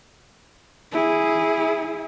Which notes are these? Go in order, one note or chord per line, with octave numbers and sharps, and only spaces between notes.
E4 G#4